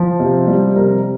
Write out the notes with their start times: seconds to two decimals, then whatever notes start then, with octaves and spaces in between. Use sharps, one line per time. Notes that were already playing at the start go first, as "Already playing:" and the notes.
Already playing: F3
0.20 C3
0.47 G3
0.76 C3 A#4